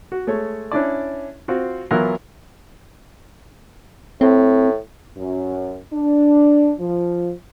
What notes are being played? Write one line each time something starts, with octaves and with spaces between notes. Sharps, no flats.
F#4
G#3 A3 C#5
C#4 D4 E4 D5
C4 F4 F#4
E3 F#3 B3 E4 F4 A#4
A2 C4
F#2
D4
F3